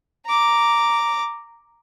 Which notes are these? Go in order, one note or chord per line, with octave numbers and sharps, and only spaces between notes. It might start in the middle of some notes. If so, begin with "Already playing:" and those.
A#5 D6